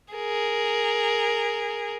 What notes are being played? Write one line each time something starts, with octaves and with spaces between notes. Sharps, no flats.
G#4 A#4